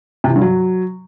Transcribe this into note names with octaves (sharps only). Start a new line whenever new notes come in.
C3
E3
G2
F#3